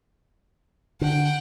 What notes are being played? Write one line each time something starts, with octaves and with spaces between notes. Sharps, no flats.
D3 F#5 G5